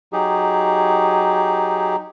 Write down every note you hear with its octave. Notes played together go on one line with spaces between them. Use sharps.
F#3 D#4 G4 G#4